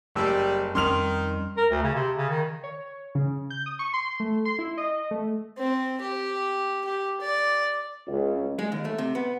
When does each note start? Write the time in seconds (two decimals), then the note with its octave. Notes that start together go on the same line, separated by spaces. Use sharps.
0.15 F#1 G3 E6
0.75 F2 D#3 G3 C#4 C6 F6 F7
1.57 A#4
1.71 D2
1.83 C#3
1.95 C3
2.17 C#3
2.29 D#3
2.64 C#5
3.15 C#3
3.50 G6
3.66 D#6
3.79 C#6
3.93 C6
4.20 A3
4.45 C6
4.59 E4
4.77 D#5
5.11 A3
5.58 C4
6.02 G4
6.85 G4
7.21 D5
8.08 C#2
8.59 G#3
8.72 D#2
8.85 A3
8.98 C3
9.15 B3